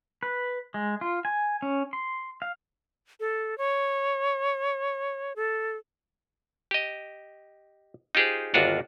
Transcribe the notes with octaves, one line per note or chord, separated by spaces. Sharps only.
B4
G#3
F4
G#5
C#4
C6
F5
A4
C#5
A4
G4 D#5
D#4 F4 G4 G#4 C5
G1 D#2 D4 F4 F#4 A#4